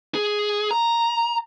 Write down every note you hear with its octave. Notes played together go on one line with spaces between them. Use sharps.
G#4
A#5